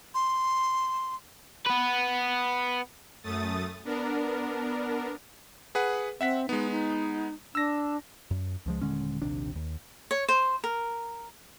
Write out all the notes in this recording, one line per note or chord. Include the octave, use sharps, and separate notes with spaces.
C6
B3 B4
F#2 A3 D#6 A6
B3 D4 A#4
G#4 B4 F#5
C4 E5 F#5 B6
G#3 B3 D#4
D#4
D4 E6 A#6
F#2
C#2 F3 G#3
D#1 D3 G#3 C#4
A#1 D#2 C3 D4
D#2
C#5
C5
A#4